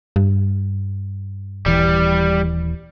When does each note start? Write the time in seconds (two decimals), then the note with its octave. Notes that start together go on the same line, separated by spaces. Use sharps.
0.16 G2
1.66 D#1 E3 G3